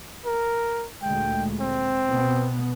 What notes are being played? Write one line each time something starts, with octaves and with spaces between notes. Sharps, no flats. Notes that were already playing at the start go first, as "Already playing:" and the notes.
A#4
D2 A#2 G#3 G5
C4
B2 B3